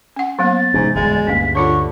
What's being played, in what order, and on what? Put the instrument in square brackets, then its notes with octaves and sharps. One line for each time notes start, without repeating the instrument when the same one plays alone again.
[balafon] C#4 F#5
[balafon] F#3 A#3 B3 [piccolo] A6
[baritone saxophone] G#2 [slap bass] C3 E3 C#4
[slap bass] D1 E2 G3 [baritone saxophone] G#3
[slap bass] D2 G2 [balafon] A#3 C#4 [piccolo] B6
[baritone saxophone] D3 [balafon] F4 A4 C#5 [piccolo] C#6